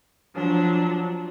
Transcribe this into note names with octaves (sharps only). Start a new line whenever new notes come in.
F3 F#3 D4